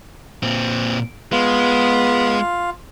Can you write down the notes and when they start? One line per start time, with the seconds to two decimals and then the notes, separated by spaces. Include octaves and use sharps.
0.43 A#2 C4
1.32 G#3 B3 F4